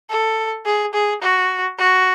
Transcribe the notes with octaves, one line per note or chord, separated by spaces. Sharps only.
A4
G#4
G#4
F#4
F#4